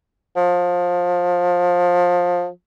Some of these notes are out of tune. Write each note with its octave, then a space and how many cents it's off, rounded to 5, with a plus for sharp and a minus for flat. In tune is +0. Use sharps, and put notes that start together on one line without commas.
F3 +20